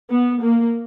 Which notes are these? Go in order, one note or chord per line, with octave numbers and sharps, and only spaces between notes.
B3
A#3